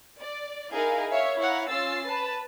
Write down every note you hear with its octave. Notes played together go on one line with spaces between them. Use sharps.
D5
D#4 E4 G#4 A#4 F5
C#5 E5 F5
E4 C#5 F5 F#5 A#5
C#4 F4 E6 A6 C7
B4 A5